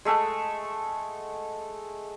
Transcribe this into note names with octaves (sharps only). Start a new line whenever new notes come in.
G#3 A3 E5 F#5